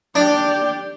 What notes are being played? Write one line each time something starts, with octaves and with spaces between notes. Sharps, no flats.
D4 G4 D5